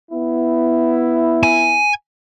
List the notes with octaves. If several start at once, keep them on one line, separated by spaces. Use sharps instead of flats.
B3 E4
G#5